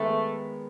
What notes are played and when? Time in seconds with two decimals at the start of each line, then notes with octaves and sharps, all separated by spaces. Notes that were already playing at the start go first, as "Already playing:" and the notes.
Already playing: D#3 G#3 A3 B3